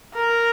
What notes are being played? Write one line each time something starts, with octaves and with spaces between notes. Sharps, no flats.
A#4